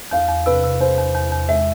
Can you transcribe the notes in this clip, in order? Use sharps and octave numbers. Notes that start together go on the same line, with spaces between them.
E2 F5
E2
C3 B4
C3
E2 C5
E2
E2
E2
G#3 E5